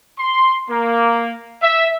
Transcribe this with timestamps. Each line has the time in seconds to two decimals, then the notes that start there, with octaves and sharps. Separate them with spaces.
0.19 C6
0.70 A#3
1.62 E5